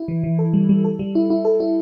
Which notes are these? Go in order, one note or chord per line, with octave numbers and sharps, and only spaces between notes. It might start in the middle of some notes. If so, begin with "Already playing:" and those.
Already playing: E4
E3
E3
A4
G3
G3
A4
G3
E4
E4
A4
E4